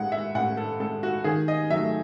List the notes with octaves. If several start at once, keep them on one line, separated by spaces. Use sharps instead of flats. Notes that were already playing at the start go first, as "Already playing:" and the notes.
Already playing: A2 G#3 F#5
E5
A2 F#5
A4
G#3 A4
F#4
D#3 G#4
D#5
F#3 A3 E5